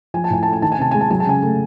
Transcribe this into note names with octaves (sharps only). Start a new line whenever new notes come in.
F3 G#5
A5
A2 G#5
A3 A5
G#5
D#3 A5
G#5
C3 A5
G#3 G#5
A5
F#3 G#5
A5
C#3 G#5
A3